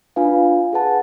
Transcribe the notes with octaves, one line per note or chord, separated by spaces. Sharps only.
D4 F4 B4 F5 G#5
G#4 B4 F#5 A5